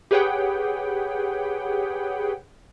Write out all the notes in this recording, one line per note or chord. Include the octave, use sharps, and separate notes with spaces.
G4 G#4 B4 C#5 F#5 G5